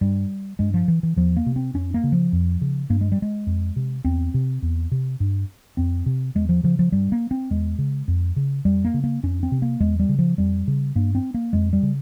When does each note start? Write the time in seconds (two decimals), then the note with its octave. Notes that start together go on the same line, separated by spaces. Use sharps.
0.01 G2 G3
0.59 G2 G#3
0.74 F3
0.88 E3
1.03 E3
1.16 E2 F3
1.37 A#3
1.46 C3
1.56 C4
1.74 F2 C#4
1.94 A#3
2.04 C#3
2.12 F3
2.33 F2
2.61 C#3
2.90 G2 A#3
3.01 G#3
3.12 G3
3.22 G#3
3.47 F2
3.76 C3
4.05 E2 C4
4.34 C3
4.62 E2
4.92 C3
5.20 G2
5.77 F2 C4
6.06 C3
6.35 E2 G#3
6.49 F3
6.63 C#3 F3
6.79 F3
6.92 G2 G3
7.12 A#3
7.31 C4
7.50 E2 G#3
7.79 C#3
8.08 F2
8.36 C#3
8.65 F2 G3
8.85 A#3
8.94 C#3
9.04 A#3
9.23 F2 C#4
9.43 C4
9.52 C3
9.62 A#3
9.80 E2 G#3
10.00 G3
10.09 C#3
10.19 F3
10.38 F2 G3
10.68 C#3
10.95 G2 A#3
11.15 C4
11.34 A#3
11.53 F2 G#3
11.73 G3
11.83 C#3